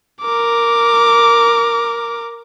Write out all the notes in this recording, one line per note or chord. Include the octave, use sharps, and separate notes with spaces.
A#4 D6